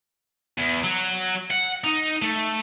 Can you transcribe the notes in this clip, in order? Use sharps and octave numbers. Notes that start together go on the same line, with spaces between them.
E2
F#3
F#5
D#4
A3